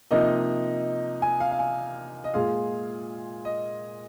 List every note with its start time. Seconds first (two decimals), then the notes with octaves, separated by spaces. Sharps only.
0.11 C3 F3 A#3 D#4 D#5
1.22 G#5
1.40 F5
1.51 F5
1.59 G#5
2.24 D#5
2.34 A#2 G#3 F4 G#4 F5
3.45 D#5